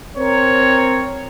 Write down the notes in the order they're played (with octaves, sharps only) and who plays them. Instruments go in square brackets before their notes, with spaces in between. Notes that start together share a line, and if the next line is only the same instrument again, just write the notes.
[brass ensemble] C4 A#4 C#5